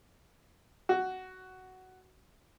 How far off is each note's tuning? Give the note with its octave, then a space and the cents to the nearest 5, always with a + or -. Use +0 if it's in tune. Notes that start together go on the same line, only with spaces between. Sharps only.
F#4 +10